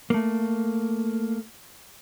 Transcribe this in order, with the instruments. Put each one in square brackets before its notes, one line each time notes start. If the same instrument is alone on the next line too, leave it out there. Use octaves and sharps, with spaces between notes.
[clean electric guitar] A3 A#3